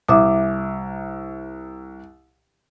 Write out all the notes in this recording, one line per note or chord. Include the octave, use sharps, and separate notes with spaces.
C2 E5 D6 D#6